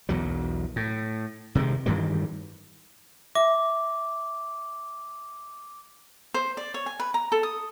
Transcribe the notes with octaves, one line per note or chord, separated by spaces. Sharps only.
B1 E2 F#3
A2
C3 D#3 G3 G#3
G2 D#3 E3 G3
E5 D6
C5
D5
C#5
G#5
B4
A#5
A4
D#6